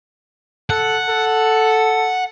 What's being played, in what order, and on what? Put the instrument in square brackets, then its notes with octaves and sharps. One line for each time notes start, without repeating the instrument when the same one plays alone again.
[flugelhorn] A4 [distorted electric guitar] F#5
[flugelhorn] A4